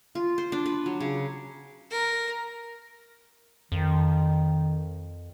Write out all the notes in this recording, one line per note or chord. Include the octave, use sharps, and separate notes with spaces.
F4
C5
D4
B4
F#3
C#3
A#4
F2 D#3